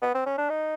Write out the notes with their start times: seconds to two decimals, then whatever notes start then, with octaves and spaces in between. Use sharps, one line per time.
0.02 B3
0.14 C4
0.26 C#4
0.38 D4
0.50 D#4